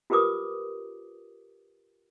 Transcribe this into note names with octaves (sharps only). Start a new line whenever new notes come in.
F4 G4 A#4 B4 D6 D#6